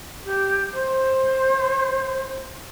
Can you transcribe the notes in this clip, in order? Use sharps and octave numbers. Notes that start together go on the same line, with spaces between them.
G4
C5